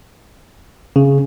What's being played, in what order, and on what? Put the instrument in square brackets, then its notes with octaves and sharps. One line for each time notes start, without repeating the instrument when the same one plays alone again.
[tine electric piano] C#3